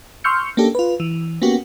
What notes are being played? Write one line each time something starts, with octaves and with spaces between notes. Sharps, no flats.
C6 C#6 E6 F6 G6 C#7
A#3 C#4 D4 G4 A4
F4 B4
E3
A#3 B3 C#4 F#4 G4